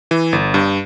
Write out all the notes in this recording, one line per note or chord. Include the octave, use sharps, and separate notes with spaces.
E3
G1
G2